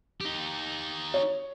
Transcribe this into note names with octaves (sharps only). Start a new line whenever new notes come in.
D#4 G4
C#5